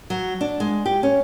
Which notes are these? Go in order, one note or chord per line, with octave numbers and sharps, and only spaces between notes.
F#3
D4
G#3
G4
C#4